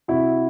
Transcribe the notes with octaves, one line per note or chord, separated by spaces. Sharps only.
C3 E4 F#4